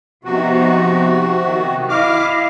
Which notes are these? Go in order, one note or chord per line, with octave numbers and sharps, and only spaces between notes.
C3 F3 B3 D#4 F#4
D#3
E4 D#5 F5 D6 F6